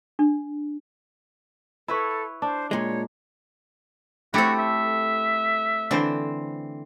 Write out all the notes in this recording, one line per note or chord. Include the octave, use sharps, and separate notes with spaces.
D4
E4 A4 B4 C#5
D4 C5
A#2 G#3 C#5
A3 C4 E4 F#4 G4 A4
E5
D3 E3 C4 C5